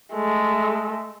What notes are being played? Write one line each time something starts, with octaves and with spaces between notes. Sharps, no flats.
G#3 A3